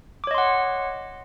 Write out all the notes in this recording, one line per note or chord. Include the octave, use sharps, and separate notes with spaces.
C#5 D#5 F#5 C6 D6